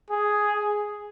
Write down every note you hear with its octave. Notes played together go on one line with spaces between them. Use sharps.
G#4